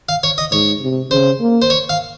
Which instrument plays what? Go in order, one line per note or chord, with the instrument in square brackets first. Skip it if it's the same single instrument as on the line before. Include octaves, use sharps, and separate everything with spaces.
[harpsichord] F5
C#5
D#5
[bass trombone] G#2 [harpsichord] C#5
[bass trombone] C3
[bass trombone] C#3 [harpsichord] C5
[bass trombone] A#3
[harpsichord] C5
C#5
F5